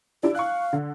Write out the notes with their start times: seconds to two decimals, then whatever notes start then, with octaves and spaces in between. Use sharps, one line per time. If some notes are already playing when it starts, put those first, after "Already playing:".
0.23 D4 E4 G4
0.35 F5 C#6 F#6
0.73 D3